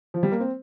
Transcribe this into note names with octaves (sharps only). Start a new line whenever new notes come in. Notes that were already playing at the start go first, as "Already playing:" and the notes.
F3
G3
A#3
C4